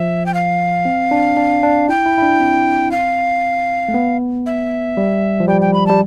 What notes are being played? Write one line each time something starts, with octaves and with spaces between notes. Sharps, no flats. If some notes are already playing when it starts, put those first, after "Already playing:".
Already playing: F3 E5
G5
F5
C4
D4
D4
D4
E4 G5
E4
E4
D4
C4
F5
A3
B3
E5
G3
F3
G3 G5
G5
B5
G3 A5